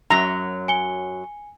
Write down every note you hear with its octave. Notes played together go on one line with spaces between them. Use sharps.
F#2 F#3 A#5 F7
G#5 C#7 G7